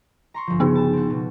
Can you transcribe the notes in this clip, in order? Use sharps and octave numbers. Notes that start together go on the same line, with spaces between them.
A#5 C6 C#6
G1 F3
C#3 B3 D#4 G#4
A5
C4 F#4
B2